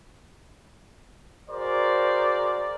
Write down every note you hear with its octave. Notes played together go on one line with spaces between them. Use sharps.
F#4 G#4 A#4 C5 D5